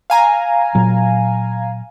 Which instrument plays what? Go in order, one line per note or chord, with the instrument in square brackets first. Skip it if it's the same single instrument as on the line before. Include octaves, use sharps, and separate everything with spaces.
[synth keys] F5 G#5 A#5
[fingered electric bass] A#2 F#3